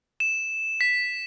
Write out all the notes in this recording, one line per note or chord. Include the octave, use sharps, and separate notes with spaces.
E7
B6